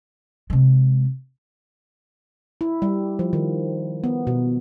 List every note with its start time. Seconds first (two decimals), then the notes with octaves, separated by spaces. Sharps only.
0.50 C3 G#3
2.61 E4
2.82 G3
3.19 F3
3.33 D#3
4.04 B3
4.27 B2